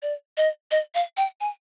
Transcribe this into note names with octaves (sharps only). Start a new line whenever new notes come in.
D5
D#5
D#5
F5
G5
G#5